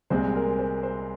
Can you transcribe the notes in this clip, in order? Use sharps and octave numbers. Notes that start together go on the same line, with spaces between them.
C2 A#2 G#3 C4 C5
A#4
C5
C5